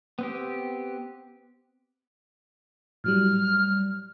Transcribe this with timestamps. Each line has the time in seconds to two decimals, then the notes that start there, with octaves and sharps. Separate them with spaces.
0.19 B3 C4 G4
3.04 A2 F#3 G3 F6